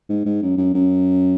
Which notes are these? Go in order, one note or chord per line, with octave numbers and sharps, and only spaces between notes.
G#2
G#2
F#2
F#2
F#2